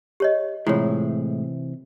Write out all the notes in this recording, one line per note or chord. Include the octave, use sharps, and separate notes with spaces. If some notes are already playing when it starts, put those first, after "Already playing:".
G4 C#5 D#5
A2 C3 E3 G#3 E4 F4 C#5